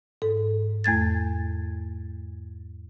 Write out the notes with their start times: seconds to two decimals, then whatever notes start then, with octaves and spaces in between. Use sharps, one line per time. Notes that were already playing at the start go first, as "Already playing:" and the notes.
0.22 G#2 A4
0.84 E2 A3 G#6 A6